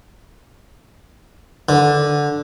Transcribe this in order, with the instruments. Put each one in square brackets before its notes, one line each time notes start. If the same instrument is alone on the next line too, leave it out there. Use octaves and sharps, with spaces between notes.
[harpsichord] D3